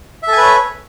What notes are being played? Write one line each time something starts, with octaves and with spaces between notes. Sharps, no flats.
A4 B4 C#5 E5 G#5